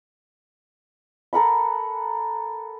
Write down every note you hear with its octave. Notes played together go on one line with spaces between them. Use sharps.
A4 A#4 F#5 B5